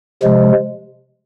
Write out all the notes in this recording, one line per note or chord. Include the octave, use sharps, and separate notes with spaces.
C3 F3 G#3